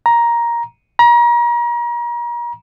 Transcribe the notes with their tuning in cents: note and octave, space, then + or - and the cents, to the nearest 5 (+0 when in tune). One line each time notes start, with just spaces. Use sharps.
A#5 +10
A#5 +35